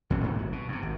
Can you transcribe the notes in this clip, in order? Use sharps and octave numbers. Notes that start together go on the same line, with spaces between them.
E2 A2 C#4
G#2 C3 D#3 E3
G#1 F#3
B2
G2 C3
G#1